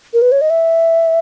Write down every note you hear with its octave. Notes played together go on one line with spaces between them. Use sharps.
A#4
B4
C#5
D#5
E5